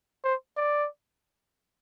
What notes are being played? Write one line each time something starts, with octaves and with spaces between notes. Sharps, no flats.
C5
D5